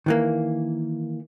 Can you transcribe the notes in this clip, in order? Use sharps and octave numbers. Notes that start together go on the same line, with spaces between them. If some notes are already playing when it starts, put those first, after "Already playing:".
D#3 E3 A#3